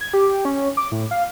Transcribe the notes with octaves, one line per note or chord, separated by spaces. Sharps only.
G#6
G4
C#4
D6
A2
F5